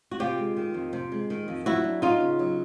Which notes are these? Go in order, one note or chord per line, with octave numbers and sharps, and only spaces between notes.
F#4
C3 F4 G4
G#3
D#3
F2
C3
G#3
D#3
F2
F#3 E4 F#4
D4
B3 D#4 F4
C#3
F#3